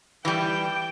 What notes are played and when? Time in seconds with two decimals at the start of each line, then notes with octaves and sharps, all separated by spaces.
0.25 E3 G3 G5